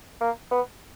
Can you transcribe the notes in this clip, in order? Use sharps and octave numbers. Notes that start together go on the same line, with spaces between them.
A#3
B3